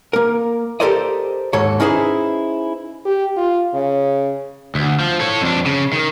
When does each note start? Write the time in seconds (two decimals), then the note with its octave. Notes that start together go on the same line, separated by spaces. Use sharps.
0.13 A#3 A#4
0.80 G4 A4 A#4 C5 D5 D#5
1.53 D#2 G#2 A4 C#5
1.80 C#4 D#4 E4 G#4 B4 C5
3.05 G4
3.37 F4
3.74 C#3
4.75 D2
5.00 F3
5.20 A4 C#5
5.41 F2 D4
5.66 C#3
5.93 D#3